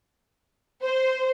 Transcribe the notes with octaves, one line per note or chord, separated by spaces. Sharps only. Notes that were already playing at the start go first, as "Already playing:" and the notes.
C5